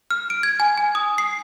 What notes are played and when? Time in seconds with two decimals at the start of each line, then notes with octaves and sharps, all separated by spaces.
0.10 F6
0.30 D7
0.43 G#6
0.60 G#5
0.78 G#5
0.95 D#6
1.18 C7